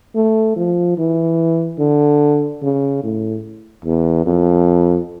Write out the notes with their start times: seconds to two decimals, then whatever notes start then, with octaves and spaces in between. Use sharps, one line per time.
0.15 A3
0.56 F3
0.98 E3
1.79 D3
2.62 C#3
3.04 A2
3.85 E2
4.26 F2